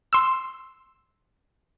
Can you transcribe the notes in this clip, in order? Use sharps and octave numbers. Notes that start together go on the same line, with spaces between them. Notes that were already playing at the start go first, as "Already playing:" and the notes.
C6 E6